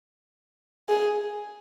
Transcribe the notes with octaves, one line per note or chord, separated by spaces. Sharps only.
G#4